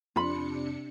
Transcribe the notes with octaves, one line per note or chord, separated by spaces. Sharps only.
F2 C3 D4 F4 B5 C#7